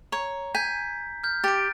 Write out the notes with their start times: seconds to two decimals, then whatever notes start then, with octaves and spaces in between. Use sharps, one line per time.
0.12 C#5 A#5
0.55 G#5 G6 B6
1.24 F6 G6
1.44 G4 A6 D7